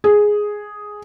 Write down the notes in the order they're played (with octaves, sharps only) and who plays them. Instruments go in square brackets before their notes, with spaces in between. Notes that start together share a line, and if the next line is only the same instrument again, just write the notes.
[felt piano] G#4